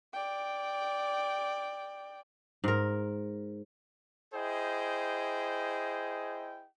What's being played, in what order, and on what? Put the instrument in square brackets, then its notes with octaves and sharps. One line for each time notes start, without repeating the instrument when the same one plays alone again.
[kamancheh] D5 G5
[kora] G#2 A#4
[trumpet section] E4 G#4 C5 D#5 G5